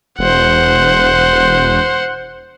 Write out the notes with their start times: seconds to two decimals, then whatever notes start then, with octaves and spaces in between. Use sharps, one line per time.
0.19 E1 C5 F#5